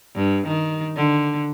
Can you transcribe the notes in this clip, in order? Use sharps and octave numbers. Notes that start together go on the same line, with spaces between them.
G2
D#3
D3